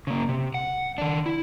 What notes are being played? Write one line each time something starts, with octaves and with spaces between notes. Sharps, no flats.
C#3 A#3
C3
F#5
D#3 D4
E4